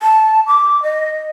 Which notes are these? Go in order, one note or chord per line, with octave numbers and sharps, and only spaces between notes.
A5
D6
D#5